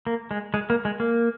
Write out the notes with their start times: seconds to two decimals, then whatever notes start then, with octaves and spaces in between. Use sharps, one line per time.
0.07 A#3
0.31 G#3
0.54 G#3
0.70 A#3
0.85 G#3
1.00 A#3